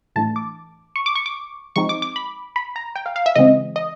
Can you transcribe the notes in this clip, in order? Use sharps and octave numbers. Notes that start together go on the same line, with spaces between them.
A2 E3 A3 D4 A5
D6
C#6
D6
C#6
D6
F3 G#3 C4 D#4 C#6
D6
D6
B5
B5
A#5
G5
F5
F5
E5
C#3 E3 G#3 C4 D#5
D#5